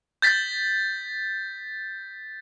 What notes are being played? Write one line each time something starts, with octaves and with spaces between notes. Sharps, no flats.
G6 A6 B6